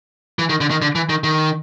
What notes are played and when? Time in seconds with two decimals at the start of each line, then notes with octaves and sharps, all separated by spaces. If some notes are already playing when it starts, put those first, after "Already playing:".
0.39 E3
0.50 D#3
0.61 D3
0.71 D#3
0.82 D3
0.95 E3
1.09 D#3
1.24 D#3